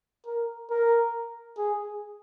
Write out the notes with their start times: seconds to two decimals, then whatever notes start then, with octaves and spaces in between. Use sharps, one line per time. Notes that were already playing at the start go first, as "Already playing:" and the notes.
0.26 A#4
0.70 A#4
1.58 G#4